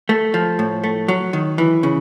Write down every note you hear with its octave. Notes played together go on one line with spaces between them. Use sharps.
A3
F3
A2
A3
F#3
D#3
E3
C#3